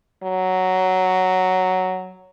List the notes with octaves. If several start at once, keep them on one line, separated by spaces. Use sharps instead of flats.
F#3